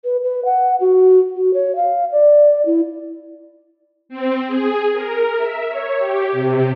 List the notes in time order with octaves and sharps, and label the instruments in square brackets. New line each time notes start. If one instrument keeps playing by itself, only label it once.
[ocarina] B4
B4
F#5
F#4
F#4
C#5
F5
D5
E4
[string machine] C4
G#4
A#4
E5
C#5
G4
C3